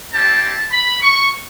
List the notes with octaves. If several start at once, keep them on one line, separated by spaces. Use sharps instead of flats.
G3 C4 E4 G4 A5
B5
C#6